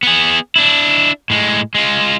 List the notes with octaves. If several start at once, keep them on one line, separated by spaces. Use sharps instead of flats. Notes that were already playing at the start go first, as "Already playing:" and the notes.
B3 G#4
D4 E4
A2 G#3
G#3 F4